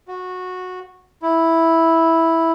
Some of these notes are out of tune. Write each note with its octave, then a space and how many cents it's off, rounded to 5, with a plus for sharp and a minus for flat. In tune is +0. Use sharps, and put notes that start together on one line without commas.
F#4 -15
E4 -5